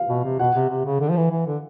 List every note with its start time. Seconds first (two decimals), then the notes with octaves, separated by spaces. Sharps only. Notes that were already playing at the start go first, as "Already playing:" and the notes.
Already playing: F5
0.09 B2
0.24 C3
0.39 B2 F#5
0.55 C3
0.70 C3
0.85 C#3
1.01 D3
1.10 F3
1.17 E3
1.31 E3
1.47 D3